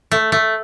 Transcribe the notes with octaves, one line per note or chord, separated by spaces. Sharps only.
A3
A3